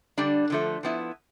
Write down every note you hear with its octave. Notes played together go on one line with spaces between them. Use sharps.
D3 G3 D4
D3 F3 A3
F3 B3 E4